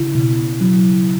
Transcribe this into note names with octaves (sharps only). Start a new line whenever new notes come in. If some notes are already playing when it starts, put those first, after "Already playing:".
Already playing: C#3 E4
B2
F#3